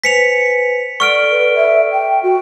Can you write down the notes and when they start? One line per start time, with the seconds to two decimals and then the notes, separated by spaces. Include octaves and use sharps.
0.04 B4 C5 G#5 B6 C#7 F7
1.00 A4 D5 F#5 C#6 F6 D7
1.31 B4
1.55 E5
1.91 G5
2.23 F#4